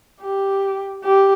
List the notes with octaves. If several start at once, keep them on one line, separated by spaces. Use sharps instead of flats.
G4
G4